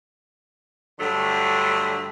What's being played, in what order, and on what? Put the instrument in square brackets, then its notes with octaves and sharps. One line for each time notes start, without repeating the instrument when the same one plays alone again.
[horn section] G2 D3 F#3 A3